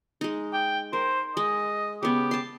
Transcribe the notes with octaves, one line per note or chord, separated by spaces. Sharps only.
G#3 D#4
G5
A#4 C5
G#3 D#5
C#3 B3 G4
A5 C6